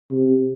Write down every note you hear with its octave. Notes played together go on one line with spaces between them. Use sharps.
C3